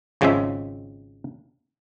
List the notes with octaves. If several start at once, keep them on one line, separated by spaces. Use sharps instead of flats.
G#1 C#3 F3 G#3 C#4 E5